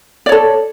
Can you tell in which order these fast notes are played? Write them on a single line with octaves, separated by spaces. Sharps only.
D5 C#5 A4